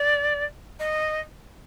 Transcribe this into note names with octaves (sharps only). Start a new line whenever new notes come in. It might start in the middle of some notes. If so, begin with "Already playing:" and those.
Already playing: D5
D#5